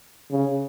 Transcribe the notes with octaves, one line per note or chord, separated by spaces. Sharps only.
C#3